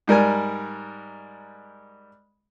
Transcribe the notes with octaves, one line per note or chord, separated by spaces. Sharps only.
G#2 G3 A#4 G#5